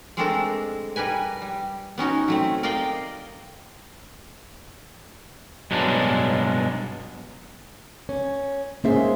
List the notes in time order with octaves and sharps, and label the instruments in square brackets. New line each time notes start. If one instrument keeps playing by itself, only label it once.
[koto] G#3 A3 C4 D4 A4 A#4
G3 A#4 B4 G#5
G3
B3 C#4 D#4 F#4
F#3 A3 C4
A#4 D5 D#5 F5 G5
[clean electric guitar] G2 B2 F#3 G#3 D4
[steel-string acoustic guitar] C#4
[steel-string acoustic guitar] G#2 C5 E5 [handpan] A#3 C#4 G#4